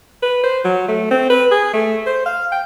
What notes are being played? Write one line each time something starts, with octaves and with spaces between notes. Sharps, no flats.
B4
C5
F#3
A3
C4
B4
G#4
A3
C5
F5
G5